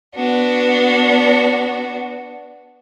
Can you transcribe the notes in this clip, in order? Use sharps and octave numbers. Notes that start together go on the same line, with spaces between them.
B3 D4 F#4